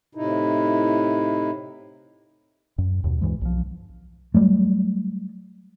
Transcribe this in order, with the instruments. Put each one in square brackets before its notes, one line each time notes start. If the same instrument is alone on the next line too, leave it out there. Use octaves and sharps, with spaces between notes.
[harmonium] A2 C3 D#4 E4
[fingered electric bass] F#2
D#2 B2
D2 G2 E3 G#3
B1 F3
F#3 G3 A3